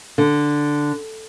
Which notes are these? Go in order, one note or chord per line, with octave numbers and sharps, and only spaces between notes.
D3